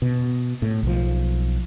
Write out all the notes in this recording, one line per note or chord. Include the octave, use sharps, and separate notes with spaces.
B2
A2
B1 F3